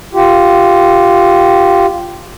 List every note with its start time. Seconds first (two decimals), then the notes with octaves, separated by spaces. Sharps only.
0.14 F4 G4